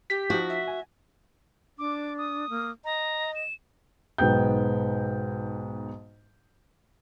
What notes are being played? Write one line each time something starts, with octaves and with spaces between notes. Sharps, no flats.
G4 B6
F3 D#4 F#4
E5
G#5
D4 D6
D#6
A#3
D#5 A#5
E7
B1 G#2 B3 G5 G6